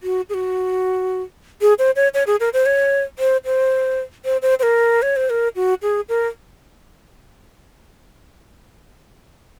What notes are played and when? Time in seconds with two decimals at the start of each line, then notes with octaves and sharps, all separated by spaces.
0.03 F#4
0.29 G#4
0.34 F#4
1.61 G#4
1.79 C5
1.96 C#5
2.14 C#5
2.27 G#4
2.40 A#4
2.53 C5
2.66 C#5
3.19 C5
3.45 C5
4.25 C5
4.42 C5
4.59 C5
4.63 A#4
5.02 C#5
5.16 C5
5.30 A#4
5.56 F#4
5.82 G#4
6.09 A#4